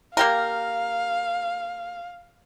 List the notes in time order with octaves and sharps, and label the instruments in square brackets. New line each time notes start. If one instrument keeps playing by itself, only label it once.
[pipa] A#3 G4 A#4 [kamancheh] F5